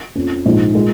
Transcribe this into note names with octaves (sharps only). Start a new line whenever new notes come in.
F2 F3 C#4
A#1 G#2 G#3 F4
A#2 G#3